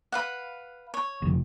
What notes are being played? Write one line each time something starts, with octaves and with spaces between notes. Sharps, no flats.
B4 F5 F#5
C#5
F1